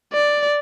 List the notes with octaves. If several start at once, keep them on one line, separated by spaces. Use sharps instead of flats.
D5